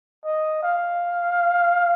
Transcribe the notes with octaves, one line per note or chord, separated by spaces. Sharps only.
D#5
F5